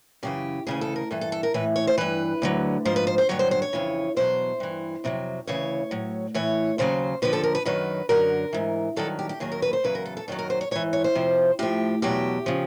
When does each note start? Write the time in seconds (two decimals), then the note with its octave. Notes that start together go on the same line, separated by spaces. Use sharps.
0.23 F#2 C#3 E3 G4
0.67 D2 C#3 E3 G#4
0.81 A4
0.96 A#4
1.11 G2 E3 A4
1.21 A4
1.32 A4
1.43 A#4
1.54 A2 E3 B4
1.76 C#5
1.87 C5
1.98 G2 E3 B4
2.42 D2 D3 F#3
2.85 G#2 F3 C5
2.96 B4
3.07 C5
3.18 C5
3.29 G2 D3 F#3 C#5
3.39 C5
3.51 C5
3.62 C#5
3.73 F2 C#3 E3
4.16 E2 B2 F#3 C5
4.60 G2 E3
5.04 F2 C3 D#3 F#3
5.47 D2 C#3 E3 C#5
5.91 A2 F#3
6.34 A2 E3 C#5
6.78 D#2 C#3 F#3 C5
7.22 D#2 D3 F3 B4
7.33 A4
7.44 A#4
7.55 B4
7.65 F#2 D#3 F#3 B4
8.09 F#2 D3 F#3 A#4
8.53 G#2 E3
8.96 G2 D#3 F#3 A4
9.19 G4
9.29 G4
9.40 D#2 D#3 F#3 G#4
9.52 A#4
9.62 B4
9.73 C5
9.84 E2 C#3 F#3 B4
9.95 A#4
10.06 A4
10.17 A4
10.28 F#2 D#3 F#3 A4
10.39 A#4
10.50 C5
10.61 C#5
10.71 G#2 E3 C#5
10.93 C#5
11.04 C5
11.15 F2 C3 F3
11.59 A2 F3 G4
12.02 E2 B2 F#3 G4
12.46 C#3 F3